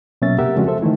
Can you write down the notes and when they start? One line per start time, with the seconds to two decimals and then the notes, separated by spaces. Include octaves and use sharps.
0.22 B2 F#3 A#3 C#4 E5 A6
0.38 C3 G4 A#4 E5 F#5
0.56 C#3 F3 G#3 C4 C#4 F#4
0.67 A4 C5 E5
0.82 D#3 E3 A3 E4